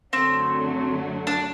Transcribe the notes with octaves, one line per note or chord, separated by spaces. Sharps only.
F#2 D3 F#3 A3 C4
D4